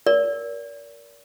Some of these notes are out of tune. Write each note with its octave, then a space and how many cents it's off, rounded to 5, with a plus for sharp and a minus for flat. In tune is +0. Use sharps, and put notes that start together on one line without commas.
A#4 +15 D5 -35